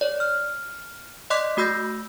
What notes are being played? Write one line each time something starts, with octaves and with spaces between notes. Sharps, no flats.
C#5 D5
F6
D5 D#5 C6 D6 F#6 B6
A3 F#4 B5 E6 G6 A#6